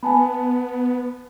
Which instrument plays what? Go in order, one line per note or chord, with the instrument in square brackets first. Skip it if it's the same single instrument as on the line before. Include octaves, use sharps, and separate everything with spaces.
[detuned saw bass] B3 [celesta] G#5 A5 B5